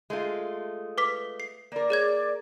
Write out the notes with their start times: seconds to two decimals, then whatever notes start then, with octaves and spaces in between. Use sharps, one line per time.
0.10 G#3 A3 F4
0.98 B4 D6 B6
1.40 C7
1.72 A#3 A#4 D5
1.90 G#4 C#5 G#6